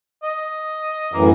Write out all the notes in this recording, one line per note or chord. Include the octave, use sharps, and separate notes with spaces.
D#5
F#2 A2 E3 A#3